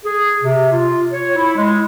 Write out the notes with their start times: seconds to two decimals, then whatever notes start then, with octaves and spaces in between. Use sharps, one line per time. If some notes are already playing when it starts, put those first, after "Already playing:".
0.03 G#4
0.41 C3
0.71 F4
1.13 C#5
1.36 E4
1.56 G#3